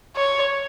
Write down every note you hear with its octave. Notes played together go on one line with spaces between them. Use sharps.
C#5